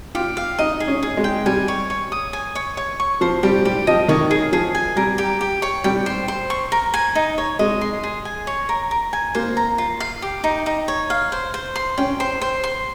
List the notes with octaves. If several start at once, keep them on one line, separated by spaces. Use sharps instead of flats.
F4 G4
F5
D#4 D#5
G#4
C#4
G#4
G#3
G5
G3 G#5
C#5
C#5
D#6
G#5
C#5
C#5
C#6
F3 C5
G3 G4
G3 G4
F3 D#5
D#3 C#5
G#4
F3 G#4
G#5
G3 A#4
G4
G4
C#5
G3 G5
C5
C5
C#6
A#4
G#5
D#4
C#5
G#3 D#5
C6
G#4
G#5
C#5
A#4
A#4
G#5
A#3 C5
A#5
F4
F5
G4
D#4
D#4
C#5
F5
C5
C5
C6
C#4 G5
C5
C5
C6